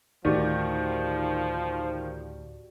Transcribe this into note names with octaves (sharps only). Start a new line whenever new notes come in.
D2 A2 D#3 F3 F#4 G4 D5